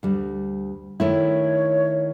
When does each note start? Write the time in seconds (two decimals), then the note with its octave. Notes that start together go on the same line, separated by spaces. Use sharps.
0.03 D2 G3
1.00 D#3 A3 E4 C#5